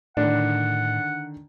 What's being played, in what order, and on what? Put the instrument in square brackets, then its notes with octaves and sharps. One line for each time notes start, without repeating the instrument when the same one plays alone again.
[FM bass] A2 [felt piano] D3 D#3 [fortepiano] D4 [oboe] F#5